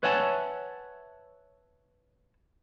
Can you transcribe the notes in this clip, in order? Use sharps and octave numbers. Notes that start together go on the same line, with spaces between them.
B4 C#5 E5 F#5 G#5 A5